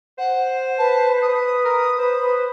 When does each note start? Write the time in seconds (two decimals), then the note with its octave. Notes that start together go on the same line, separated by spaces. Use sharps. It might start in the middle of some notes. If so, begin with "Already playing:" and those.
0.18 C5 F#5
0.78 B4 A5
1.22 D#6
1.65 A#4
1.99 B4 C5
2.20 B4